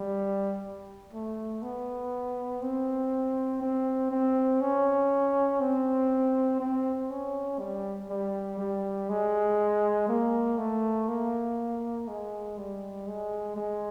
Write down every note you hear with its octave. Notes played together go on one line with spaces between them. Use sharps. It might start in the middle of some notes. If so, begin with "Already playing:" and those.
Already playing: G3
A3
B3
C4
C4
C4
C#4
C4
C4
C#4
G3
G3
G3
G#3
A#3
A3
A#3
G#3
G3
G#3
G#3